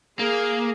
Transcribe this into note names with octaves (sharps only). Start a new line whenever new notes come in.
A#3 G#4